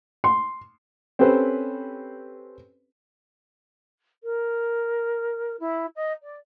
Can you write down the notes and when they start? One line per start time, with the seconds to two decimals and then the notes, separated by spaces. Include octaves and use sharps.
0.24 C6
1.19 C4 C#4 G4 A4 B4 C5
4.24 A#4
5.60 E4
5.96 D#5
6.23 D5